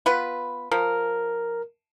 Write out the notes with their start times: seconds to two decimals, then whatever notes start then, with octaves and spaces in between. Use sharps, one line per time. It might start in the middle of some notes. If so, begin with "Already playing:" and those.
0.06 B3 F4 B4
0.71 F3 A#4